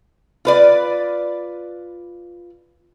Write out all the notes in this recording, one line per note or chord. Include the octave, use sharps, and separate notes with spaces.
F4 B4 D5